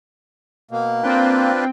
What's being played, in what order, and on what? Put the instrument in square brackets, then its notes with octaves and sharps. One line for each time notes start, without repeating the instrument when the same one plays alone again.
[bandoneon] B2 [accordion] A#3
[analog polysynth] C4 G5 [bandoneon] D4 F4 B4